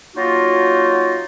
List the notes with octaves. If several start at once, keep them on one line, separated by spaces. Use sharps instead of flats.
F#3 A#3 D#4 F4 F#4